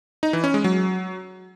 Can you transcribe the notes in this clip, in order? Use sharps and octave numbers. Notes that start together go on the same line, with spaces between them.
D#4
E3
C#4
G#3
F#3